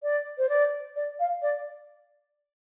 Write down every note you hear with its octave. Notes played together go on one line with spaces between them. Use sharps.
D5
C5
D5
D5
F5
D5